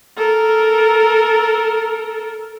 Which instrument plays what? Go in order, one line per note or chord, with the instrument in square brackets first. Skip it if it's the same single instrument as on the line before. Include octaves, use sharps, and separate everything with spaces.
[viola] A4 A#4